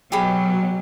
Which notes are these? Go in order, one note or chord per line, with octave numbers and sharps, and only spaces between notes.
B2 F#3 G4 G#4 B5